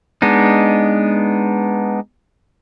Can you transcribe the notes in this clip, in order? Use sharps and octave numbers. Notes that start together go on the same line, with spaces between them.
G#3 B3 D4 D#4